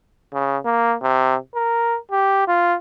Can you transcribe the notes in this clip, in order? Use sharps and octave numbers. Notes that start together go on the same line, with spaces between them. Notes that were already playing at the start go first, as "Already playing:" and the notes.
C#3
A#3
C3
A#4
G4
F4